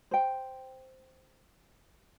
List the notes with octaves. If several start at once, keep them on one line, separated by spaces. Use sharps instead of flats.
C5 G5